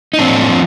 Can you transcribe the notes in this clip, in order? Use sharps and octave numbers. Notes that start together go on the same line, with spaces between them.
D#4
A2 F3 C4 D4
F3